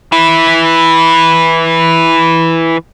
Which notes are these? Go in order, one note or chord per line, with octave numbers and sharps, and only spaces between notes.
E3 E4